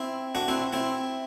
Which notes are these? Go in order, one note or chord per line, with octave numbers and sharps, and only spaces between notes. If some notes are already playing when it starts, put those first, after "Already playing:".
Already playing: C4 E4
D4 F#4
C4 E4
C4 E4